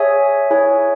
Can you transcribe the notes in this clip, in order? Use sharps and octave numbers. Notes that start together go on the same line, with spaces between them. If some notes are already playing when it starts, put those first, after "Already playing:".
Already playing: G#4 C#5 E5 G#5
E4 G#4 C#5 E5 G#5